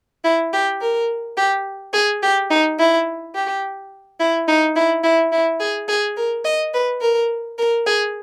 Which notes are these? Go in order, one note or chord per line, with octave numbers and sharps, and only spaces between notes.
E4
G4
A#4
G4
G#4
G4
D#4
E4
G4
E4
D#4
E4
E4
E4
G#4
G#4
A#4
D#5
B4
A#4
A#4
G#4